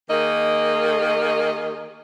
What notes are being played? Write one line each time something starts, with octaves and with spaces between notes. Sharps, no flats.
D#3 A#3 G#4 D#5